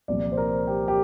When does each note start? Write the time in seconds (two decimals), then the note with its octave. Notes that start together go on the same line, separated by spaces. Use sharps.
0.08 C2 A#2 F3 D5
0.32 C5
0.37 A#4
0.67 G4
0.88 G4